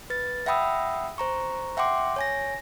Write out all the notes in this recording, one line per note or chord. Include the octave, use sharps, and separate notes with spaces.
B4 A6
E5 F#5 G5 B5 D#6 E6
C5 A#5 C#6
E5 F#5 G5 C6 D6
C#5 G#5 A#6